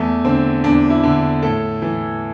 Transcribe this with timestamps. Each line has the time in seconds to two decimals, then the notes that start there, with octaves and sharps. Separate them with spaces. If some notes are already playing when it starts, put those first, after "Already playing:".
Already playing: E2 A3
0.25 D3 C4
0.64 E2 D4
0.90 E4
1.03 D3
1.43 A2 A4
1.82 E3